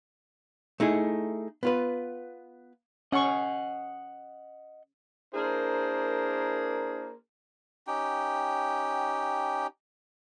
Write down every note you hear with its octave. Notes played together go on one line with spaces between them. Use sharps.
A3 D#4 E4 G#4
B3 F4 B4
C#4 D#5 F#5 C#6
A#3 D4 E4 G#4 A#4 C5
C#4 D#4 G4 G5